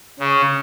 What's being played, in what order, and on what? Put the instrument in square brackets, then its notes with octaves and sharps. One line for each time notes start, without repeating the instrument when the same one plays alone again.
[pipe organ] C#3